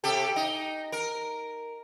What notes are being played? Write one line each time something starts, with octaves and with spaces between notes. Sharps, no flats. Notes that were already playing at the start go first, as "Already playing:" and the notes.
C3 G4 A4
D#4
A#4